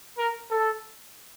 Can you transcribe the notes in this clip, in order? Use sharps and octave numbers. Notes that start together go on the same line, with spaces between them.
A#4
A4